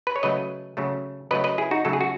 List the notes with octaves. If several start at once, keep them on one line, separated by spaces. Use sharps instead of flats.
B4
C#5
C#3 F#3 A3 B4 D#5
C#3 F#3 A3
C#3 F#3 A3 B4 D#5
B4 D#5
E4 G#4
D#4 F#4
C#3 F#3 A3 A4
G#4
F#4